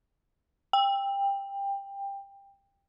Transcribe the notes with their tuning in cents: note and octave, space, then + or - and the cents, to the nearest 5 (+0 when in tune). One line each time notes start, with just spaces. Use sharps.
G5 +20